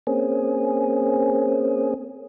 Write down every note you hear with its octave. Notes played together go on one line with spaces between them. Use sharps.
A#3 C4 C#4 G#4